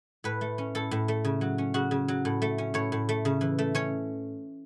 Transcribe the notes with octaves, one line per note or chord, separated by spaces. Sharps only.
A2 B4
A3
C#4
A2 A4
A2
A3
C#3
F#3
C#4
C#3 F#4
C#3
F#3
A2
A3
C#4
A2 C#5
A2
A3
C#3
E3
A3
C#4 C#5